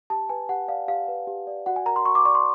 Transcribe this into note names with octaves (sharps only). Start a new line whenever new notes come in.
G4 A5
B4 G#5
G4 F#5
D5 F5
G4 F5
B4
G4
D5
F#4 F#5
G#5
A#4 A#5
C6
F#4 C#6
D6
D5 C#6
C6